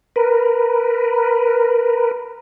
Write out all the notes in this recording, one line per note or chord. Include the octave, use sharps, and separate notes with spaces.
A#4 B4